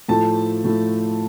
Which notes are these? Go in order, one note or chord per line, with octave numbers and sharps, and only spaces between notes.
A2 F3 A3 A5
A2 F3 A3